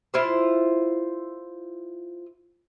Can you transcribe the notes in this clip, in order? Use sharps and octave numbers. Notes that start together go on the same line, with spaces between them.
E4 F4 C5